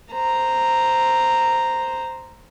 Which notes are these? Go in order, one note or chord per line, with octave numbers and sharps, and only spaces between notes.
C5 A#5